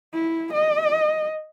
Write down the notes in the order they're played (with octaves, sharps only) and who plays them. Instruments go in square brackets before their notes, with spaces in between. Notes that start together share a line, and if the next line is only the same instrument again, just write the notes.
[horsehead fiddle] E4
D#5